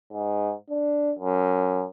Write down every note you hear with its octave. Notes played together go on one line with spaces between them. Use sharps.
G#2
D4
F#2